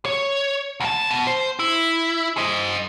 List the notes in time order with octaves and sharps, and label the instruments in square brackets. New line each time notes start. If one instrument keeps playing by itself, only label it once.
[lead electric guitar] C#5
D2 A5
B2
C5
E4
C5 D#5